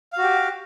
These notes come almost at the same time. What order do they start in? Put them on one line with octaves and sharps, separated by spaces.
F5 F#4 G4